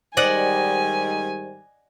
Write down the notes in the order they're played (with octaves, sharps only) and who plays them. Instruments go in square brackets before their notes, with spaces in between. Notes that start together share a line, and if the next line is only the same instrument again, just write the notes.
[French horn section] G#2 D#3 G3 [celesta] C5 [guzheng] D5 D#5 F#5 [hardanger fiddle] G#5